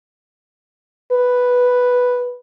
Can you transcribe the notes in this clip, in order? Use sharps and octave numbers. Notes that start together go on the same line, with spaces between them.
B4